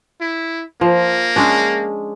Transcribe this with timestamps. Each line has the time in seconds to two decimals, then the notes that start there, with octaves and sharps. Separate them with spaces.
0.21 E4
0.81 F3 A#3
1.36 G#3 C#4 D4